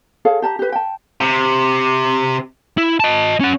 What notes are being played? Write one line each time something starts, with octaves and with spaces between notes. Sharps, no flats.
G#4 A4 C#5 F5
G4 A5 A#5
G4 B4
G5 A5
C3
E4
D#5 A5
C#4 F#5